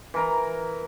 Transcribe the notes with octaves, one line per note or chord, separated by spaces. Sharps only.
E3 A#4 A#5